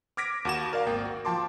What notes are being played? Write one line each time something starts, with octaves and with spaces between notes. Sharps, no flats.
D6 F6 G#6 A#6 B6 D7
D#2 F#4 E7
A#4 D5 F5
G#1 A#3 G5
F#4
F3 G5 A5 C6 D6